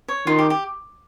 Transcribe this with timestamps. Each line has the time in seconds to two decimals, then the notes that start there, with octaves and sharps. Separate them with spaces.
0.08 C#5
0.26 D#3 F4
0.39 G4
0.50 G4